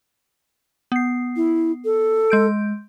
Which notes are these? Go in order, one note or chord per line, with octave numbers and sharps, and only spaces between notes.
B3 C7
E4
A4
G#3 G6 D7